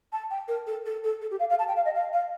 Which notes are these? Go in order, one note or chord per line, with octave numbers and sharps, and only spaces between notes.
A5
G5
A#4
A4
A4
A4
A4
G4
F5
F5
A5
G5
F5
D#5
F5
F5